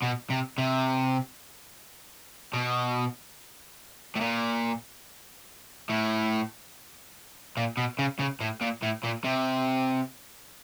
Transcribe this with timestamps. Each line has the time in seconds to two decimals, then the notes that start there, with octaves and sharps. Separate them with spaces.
0.02 B2
0.30 C3
0.58 C3
2.54 B2
4.16 A2
4.21 A#2
5.89 A2
7.57 A#2
7.77 B2
7.99 C#3
8.19 C#3
8.40 A2
8.61 A#2
8.82 A2
9.03 A#2
9.24 C3